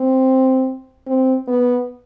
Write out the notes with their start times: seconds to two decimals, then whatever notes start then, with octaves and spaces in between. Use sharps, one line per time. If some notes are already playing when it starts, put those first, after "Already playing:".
Already playing: C4
1.06 C4
1.47 B3